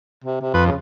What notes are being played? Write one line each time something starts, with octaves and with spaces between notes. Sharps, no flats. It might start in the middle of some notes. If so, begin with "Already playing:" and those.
C3
C3
F2 B4
C#3